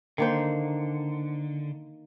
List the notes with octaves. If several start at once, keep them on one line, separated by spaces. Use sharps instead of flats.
D3 D#3 A#3 C5